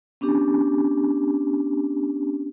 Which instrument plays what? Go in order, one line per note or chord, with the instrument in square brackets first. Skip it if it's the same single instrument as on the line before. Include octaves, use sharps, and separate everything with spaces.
[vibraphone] B3 C#4 D4 G4